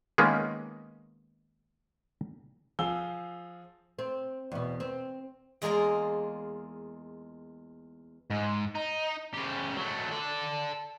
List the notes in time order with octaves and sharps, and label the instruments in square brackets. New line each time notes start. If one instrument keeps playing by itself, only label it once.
[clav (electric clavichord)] D#3 G#3 A#3 B3 C#4
[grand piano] F3 G#4 F5 E6 G7
[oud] C4
E2 B2
C4
[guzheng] E2 G#3 A#3 F4 A#4 A#5
[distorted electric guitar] G#2
D#4
C#3 G4
F#3 A3
A4 D5